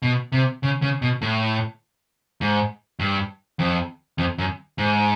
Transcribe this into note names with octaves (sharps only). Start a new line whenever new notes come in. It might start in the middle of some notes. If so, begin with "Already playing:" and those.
B2
C3
C#3
C#3
B2
A2
G#2
G2
F2
F2
F#2
G#2